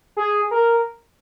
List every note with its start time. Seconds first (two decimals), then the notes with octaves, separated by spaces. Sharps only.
0.17 G#4
0.51 A#4